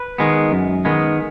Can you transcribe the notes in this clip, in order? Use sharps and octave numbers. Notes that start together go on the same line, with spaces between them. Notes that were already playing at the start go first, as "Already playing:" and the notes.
Already playing: B4
D#3 G#3 B3
F#2
D#3 G#3 B3